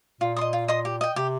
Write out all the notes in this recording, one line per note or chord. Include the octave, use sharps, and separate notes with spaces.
A#2 F4
D#5 C6 D#6
F4
D#5 C6 D#6
G4
D#5 G5
C3 G4